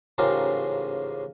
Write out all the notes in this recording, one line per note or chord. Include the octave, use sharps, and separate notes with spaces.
A1 G#2 C#3 F4 G4 A#4